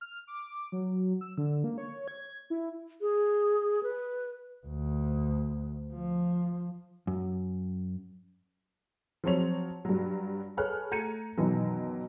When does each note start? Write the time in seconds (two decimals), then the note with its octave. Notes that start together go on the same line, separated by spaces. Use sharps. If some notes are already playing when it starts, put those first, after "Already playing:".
0.01 F6
0.27 D6
0.72 F#3
1.21 E6
1.38 D3
1.64 A#3
1.78 C#5
2.08 G#6
2.50 E4
3.01 G#4
3.83 B4
4.67 D2
5.94 F3
7.07 F#2
9.24 F3 F#3 C4 C#5 F7
9.85 G2 F#3
10.57 G#4 A4 B4 C#5 F6 F#6
10.91 A3 A#5 G6 G#6 C#7 D#7
11.37 F#2 B2 D#3 E3 F#3